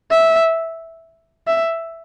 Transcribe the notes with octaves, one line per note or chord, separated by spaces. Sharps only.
E5
E5